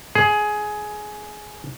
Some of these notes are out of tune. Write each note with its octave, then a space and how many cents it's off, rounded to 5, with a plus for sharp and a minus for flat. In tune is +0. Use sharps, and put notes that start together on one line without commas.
G#4 +15